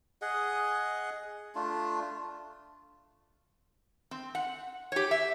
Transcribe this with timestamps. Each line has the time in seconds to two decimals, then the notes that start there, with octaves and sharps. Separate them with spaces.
0.22 G#4 D#5 F#5
1.55 A3 D4 F4
4.11 C4
4.35 F#5
4.92 G4 C#5
5.11 E5